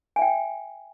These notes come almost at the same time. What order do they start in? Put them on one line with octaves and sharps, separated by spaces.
G#5 E5 G5